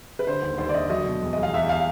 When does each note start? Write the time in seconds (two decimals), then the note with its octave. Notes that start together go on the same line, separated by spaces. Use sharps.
0.19 B4
0.27 D3 C5
0.42 D#2
0.58 D#2 C5
0.69 D5
0.74 D3 D#5
0.90 F#3 D#5
1.05 B2
1.22 E2
1.33 D#5
1.37 E2
1.43 F5
1.54 E2 E5
1.69 F5